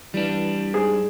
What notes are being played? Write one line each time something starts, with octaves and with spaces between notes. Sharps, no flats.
E3 G3 D4
G#2 G#4